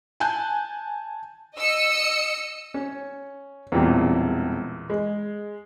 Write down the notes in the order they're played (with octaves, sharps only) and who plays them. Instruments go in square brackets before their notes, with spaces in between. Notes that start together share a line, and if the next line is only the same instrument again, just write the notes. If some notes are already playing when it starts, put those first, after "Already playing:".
[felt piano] G#5 A5 F#6 G6
[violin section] D#5 E6 C#7
[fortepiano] C#4
[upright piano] E1 G3 C4 [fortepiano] E2 A#2
[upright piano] G#3